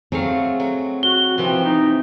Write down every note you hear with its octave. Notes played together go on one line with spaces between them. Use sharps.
F#3 A3 C4 G#4 F5
F#3
F#4 G7
C3 E3 F3 G4
D#4